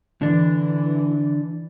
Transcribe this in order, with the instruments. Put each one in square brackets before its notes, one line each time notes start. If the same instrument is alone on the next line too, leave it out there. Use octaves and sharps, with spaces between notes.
[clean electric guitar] D3 D4 [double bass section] E3